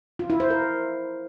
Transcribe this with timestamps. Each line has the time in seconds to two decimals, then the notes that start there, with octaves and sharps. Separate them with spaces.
0.19 F4
0.30 E4
0.40 C5
0.50 A#4